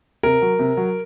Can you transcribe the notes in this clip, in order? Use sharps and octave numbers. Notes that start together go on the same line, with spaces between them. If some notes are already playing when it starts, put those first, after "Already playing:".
C3 A#4
F#3
C3
F#3